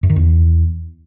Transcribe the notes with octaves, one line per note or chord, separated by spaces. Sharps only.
F#2
D#3
E2